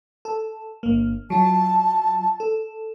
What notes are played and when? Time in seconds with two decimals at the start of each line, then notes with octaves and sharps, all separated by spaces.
0.25 A4
0.83 G1 A#3
1.30 F#3 F4 A5
2.40 A4